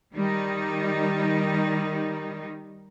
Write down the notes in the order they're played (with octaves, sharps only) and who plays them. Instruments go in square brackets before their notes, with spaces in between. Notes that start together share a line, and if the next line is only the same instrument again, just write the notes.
[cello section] D#3 G3 D#4